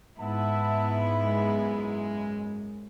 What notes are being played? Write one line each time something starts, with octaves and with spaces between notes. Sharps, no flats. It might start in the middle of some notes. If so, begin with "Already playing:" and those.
G#2 B3 E4 E5 F#5 A5
F#2 G#3